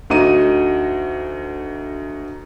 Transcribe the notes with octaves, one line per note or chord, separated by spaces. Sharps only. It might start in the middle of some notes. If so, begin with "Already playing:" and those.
D2 D#4 F#4 D#7